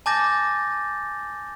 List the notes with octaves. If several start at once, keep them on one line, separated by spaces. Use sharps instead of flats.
G#5 A5 D6 G6 A6 A#6